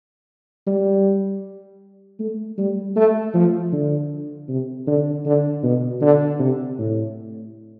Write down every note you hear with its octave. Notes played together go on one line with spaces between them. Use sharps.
G3
A3
G3
A3
F3
D3
C3
D3
D3
B2
D3
C3
A2